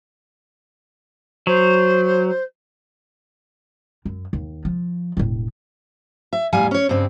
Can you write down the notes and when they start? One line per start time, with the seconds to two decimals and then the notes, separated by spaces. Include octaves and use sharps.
1.47 F#3 C5
4.05 F#2
4.33 D#2
4.65 F3
5.17 E1 A2
6.33 E5
6.52 E2 A2 G3 F5 G#5
6.71 C#4 C#5
6.89 G2 C#3 C4